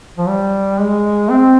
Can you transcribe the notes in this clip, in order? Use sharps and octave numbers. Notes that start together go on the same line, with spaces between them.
F3
G3
G#3
C4